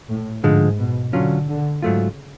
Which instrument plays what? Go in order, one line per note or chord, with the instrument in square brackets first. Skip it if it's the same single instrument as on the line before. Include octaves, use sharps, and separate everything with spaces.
[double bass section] A2
[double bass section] G#2 [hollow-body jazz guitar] D3 F3 G#3
[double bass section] B2
[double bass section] D3 [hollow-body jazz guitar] F#3 C#4 F4
[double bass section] D3
[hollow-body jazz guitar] G#2 F#3 A3 F4 [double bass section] C#3